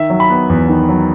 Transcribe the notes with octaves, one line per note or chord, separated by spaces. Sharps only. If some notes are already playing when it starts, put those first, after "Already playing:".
Already playing: D#3 E5
F#3
B5
B3
E2
D#3
F#3